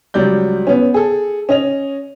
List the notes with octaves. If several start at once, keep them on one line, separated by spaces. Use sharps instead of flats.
C#2 F#3 G3 D5 G6
B3 C#4
G#4 A4
C#4 D#5 F7